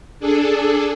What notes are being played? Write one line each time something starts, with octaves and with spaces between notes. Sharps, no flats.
D4 G#4 A4